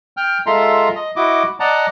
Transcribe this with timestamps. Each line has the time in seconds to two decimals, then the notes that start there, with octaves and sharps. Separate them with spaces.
0.17 G5 F6
0.46 G#3 F4 A4 E5 A#5 C6
0.95 D#5
1.16 E4 F#4 D#5 D6
1.60 D5 D#5 F#5 A5 A#5